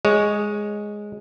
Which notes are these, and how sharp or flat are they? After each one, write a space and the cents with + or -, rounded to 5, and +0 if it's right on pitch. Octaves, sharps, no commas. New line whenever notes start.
G#3 +0 C#5 +0